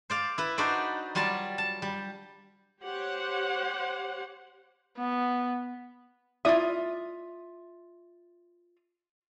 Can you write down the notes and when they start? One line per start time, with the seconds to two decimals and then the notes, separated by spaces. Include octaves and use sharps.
0.10 C5 D5 F5
0.38 E4 B4
0.58 D4 D#4 F#4 B4 C5 D5
1.15 F#3 G3 F4 D5 A5
1.58 A5
1.82 G3
2.83 G4 C5 C#5 F#5
4.98 B3
6.45 E4 F4 D5 E5 D#6